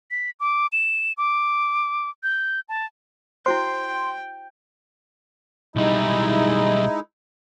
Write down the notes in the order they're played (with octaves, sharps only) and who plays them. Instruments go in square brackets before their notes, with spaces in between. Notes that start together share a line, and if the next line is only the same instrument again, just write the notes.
[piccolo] B6
D6
E7
D6
G6
A5
[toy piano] E4 F#4 C5 [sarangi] G5 [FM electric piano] C6
[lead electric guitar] B1 G3 [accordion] G#3 D#4 E4